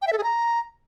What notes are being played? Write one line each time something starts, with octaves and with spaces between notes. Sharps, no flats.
G5
E5
A4
G#4
A#5